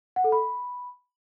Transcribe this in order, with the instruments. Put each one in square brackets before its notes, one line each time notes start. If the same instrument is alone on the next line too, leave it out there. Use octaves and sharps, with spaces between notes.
[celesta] F#5
A4
B5